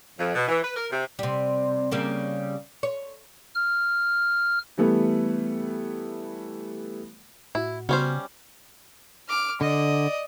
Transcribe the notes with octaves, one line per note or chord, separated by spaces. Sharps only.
F2
B2
E3
B4
A#4
C3
C3 G3
C#3 G3 A#3
C#5
F6
E3 G3 A3 B3
A2 E4 F#4
C#3 G3 B3 C#4 F#4 C5
D6 F6
D3 D5 D#5